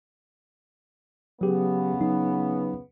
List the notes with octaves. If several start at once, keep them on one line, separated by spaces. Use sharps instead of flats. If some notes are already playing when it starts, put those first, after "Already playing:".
C#3 F#3 B3 G4 G#4
F#3 D#4